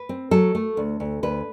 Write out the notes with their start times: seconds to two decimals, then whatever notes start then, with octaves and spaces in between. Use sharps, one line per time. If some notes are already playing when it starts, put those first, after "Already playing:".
Already playing: B4
0.09 C4
0.31 F#3 A4
0.55 A3
0.77 D2
1.00 D2
1.23 D2 B4